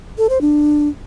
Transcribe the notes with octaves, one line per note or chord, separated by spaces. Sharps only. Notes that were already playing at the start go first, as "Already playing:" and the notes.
A4
C5
D4